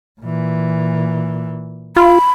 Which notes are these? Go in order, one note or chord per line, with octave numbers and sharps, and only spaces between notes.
A#2 E3
F4 B5